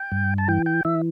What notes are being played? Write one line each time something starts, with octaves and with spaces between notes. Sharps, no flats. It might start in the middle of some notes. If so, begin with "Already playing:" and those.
Already playing: G5
G2
A5
E3 G5
G5
E3 E5